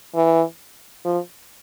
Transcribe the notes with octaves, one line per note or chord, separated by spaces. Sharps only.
E3
F3